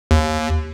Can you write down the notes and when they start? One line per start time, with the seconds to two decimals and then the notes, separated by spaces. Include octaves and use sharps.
0.11 D#2